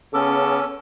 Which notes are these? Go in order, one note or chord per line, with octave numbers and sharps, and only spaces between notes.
C#3 B3 C#4 A4 D6